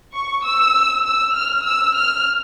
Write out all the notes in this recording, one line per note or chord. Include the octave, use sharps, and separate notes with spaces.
C#6
E6
E6
F6
E6
F6